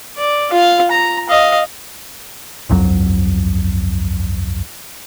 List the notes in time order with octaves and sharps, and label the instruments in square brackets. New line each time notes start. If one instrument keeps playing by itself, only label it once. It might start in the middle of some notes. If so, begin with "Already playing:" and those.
[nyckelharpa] D5
F4 F5
A#5
D#5 F5
[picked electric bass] G1 C2 F2 F#3